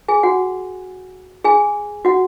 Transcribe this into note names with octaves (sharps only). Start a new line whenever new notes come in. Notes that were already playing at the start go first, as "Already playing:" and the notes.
G#4 G#5
F#4 F#5
G#4 G#5
F#4 F#5